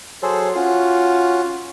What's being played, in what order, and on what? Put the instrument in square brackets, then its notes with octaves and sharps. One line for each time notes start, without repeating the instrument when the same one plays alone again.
[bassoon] F#3 [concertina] G#4 A4 C5
[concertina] C#4 F#4 [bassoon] F4